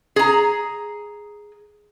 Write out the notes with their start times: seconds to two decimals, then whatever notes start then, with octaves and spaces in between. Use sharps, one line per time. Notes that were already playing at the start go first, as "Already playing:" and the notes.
0.16 G#4 A#5